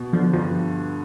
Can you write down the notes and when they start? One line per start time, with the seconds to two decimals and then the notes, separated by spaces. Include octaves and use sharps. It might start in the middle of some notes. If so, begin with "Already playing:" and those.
Already playing: B2
0.13 D3 F3
0.33 G2 F3